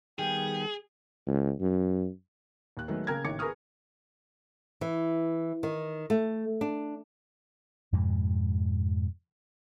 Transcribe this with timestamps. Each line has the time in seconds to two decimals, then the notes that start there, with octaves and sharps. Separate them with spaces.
0.19 D#3 G3 B3 G#4 G5
1.27 C#2
1.60 F#2
2.77 D#2 F#6
2.88 D#3 F#3 G#3 A3 B3
3.07 C#3 A#3 A#4 G5 G#6
3.25 A1 D#3 D6 G#6 C#7
3.39 G#4 A#4 B4 C#6 D#6 F6
4.81 E3
5.63 D#3
6.10 A3
6.61 D4
7.92 F2 G#2 B2 G#3